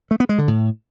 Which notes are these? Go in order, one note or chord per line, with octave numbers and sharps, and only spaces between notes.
A3
B3
G#3
D3
A2